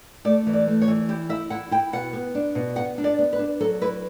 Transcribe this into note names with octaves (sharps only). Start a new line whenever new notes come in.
A3 D5
E3
D5
A3
C#5
E3
E4 G4
E4 E5
E4 F#5
E4 G5
B2 F#5
B3
D4
B2
B3 F#5
D4
D5
B3
B4
D4
F#3 A4
E4 B4